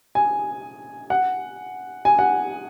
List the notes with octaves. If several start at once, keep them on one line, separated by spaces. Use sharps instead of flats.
G#5
F#5
G#5
F#5